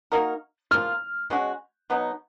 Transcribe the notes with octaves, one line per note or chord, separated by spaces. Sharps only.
A#3 D#4 F#4 A#4
F3 A#3 F4 F6
B2 G#3 C#4 F#4
B2 F#3 B3 D#4